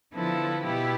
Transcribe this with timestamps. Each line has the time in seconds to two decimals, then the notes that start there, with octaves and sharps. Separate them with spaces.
0.13 D3 F3 B3 E4 A4
0.63 B2 B3 E4 G4